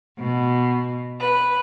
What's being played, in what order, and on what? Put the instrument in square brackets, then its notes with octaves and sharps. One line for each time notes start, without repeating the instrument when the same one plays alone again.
[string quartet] B2
B4